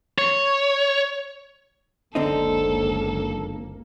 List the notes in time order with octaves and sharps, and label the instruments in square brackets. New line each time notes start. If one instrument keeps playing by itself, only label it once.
[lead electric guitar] C#5
[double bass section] F#1 C#2 A#3 [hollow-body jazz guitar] D3 C4 D#4 [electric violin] A4